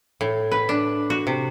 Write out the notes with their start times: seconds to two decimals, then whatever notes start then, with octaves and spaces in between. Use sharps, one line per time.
0.21 A2
0.52 B4
0.69 D4
1.10 F#4
1.27 C3